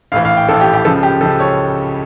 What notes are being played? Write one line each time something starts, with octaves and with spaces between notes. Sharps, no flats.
A#1 A2 E3 F5
F5
G5
A#1 A2 E3 A4
G4
G4
C#2 C#3 F3 A4
G4
C#2 C#3 F3 A4
C#5